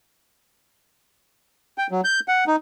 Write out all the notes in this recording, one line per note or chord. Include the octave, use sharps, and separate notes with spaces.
G5
F#3
G6
F#5
D#4